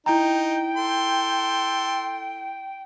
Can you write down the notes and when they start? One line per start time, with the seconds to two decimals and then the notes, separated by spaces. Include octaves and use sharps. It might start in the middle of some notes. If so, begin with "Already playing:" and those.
0.06 D#4 E4 G5 A#5
0.77 A4 C6